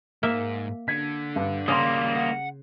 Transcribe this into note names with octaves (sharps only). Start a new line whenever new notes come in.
G#2 A#3 E5
D3 G#6 B6
G2
C#3 G3 A#3 C6 D#6
F#5